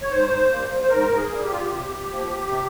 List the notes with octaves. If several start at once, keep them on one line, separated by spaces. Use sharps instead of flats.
C#5
G#2 C5
G3 A#3
C5
G#2 A#4
G#4
G3 A#3
G4
F4
G4
C3
F3 A#3
C3